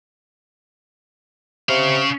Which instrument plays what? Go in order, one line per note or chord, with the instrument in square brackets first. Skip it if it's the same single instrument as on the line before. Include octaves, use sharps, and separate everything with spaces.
[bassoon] C3 [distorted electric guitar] C#4 F5